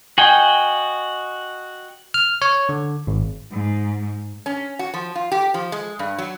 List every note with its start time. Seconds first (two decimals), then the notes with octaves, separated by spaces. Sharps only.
0.18 F#4 D#5 G5 G#5
2.14 F6
2.42 C#5
2.69 D3
3.07 G#1
3.51 G#2
4.46 C#4
4.79 F#4
4.94 F3
5.15 F4
5.32 G4
5.54 F3
5.72 G#3
5.99 G2
6.18 F#3